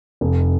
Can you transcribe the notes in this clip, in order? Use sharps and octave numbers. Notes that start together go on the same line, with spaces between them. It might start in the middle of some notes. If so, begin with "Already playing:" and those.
F1